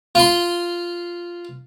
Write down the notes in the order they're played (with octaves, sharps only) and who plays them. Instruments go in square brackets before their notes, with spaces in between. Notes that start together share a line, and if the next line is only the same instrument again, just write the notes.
[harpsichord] F4 C6